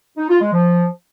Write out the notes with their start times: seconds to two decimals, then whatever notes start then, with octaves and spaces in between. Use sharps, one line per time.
0.17 D#4
0.29 F4
0.40 G#3
0.52 F3